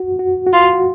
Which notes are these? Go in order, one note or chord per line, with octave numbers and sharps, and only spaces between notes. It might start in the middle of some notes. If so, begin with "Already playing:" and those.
Already playing: F#4
F#4
F#4
F4
F#4